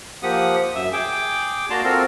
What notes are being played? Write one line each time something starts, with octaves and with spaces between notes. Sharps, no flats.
F3 A#3 G4 F#5 D#6
F#2 E5
G#4 G5 D6
A#3 F#4 D5 A5 A#5 C6
C4 F4 F#4 A4 A#4